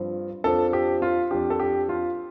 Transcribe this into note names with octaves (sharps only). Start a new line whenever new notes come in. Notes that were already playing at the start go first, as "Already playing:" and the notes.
Already playing: G2 F3 C4
F2 F3 D4 A4
G4
F4
F2 F3 D4 G4
A4
G4
F4